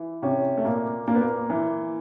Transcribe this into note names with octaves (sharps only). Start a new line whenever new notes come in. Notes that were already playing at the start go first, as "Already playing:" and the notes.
Already playing: E3
C3 C#4
A3
A#2 A#3
A#2 A#3
B3
A#3
E3